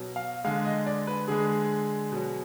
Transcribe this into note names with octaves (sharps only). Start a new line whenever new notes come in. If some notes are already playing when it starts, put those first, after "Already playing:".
Already playing: B2 F#3
F5
D3 G#3 F5
D#5
D5
B4
D3 G#3 G#4
B2 F#3